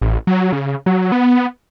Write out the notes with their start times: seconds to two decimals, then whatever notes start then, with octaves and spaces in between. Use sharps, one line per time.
0.01 A1
0.27 F#3
0.52 C#3
0.86 F#3
1.12 B3